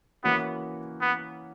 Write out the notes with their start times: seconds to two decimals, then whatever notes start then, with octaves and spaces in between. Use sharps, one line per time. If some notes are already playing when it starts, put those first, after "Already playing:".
0.24 E3 A#3 B3 C#4 F#4
1.01 B3